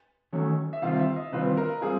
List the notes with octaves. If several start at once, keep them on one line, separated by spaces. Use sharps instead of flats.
D#3 F#3 A3 C#4
E5
C3 D#3 G3 C4 F4 F5
E5
D#5
C3 D#3 G3 C4 F4 B4
A#4
G3 C4 F4 G#4